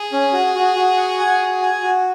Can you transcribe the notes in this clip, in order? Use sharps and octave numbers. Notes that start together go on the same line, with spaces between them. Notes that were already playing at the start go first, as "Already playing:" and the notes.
Already playing: G#4
C#4
F#4
F#4
F#4
F#5
G#5
F#4
G#5
F#4